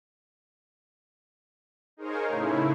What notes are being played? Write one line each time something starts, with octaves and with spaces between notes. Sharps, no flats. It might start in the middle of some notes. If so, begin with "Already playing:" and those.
D#4 G#4 A#4 C5 C#5 F5
A2 C#3 E4